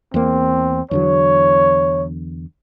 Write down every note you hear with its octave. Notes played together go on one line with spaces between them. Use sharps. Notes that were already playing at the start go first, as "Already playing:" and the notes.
E2 A#3 C4
E2 D3 F#3 C#5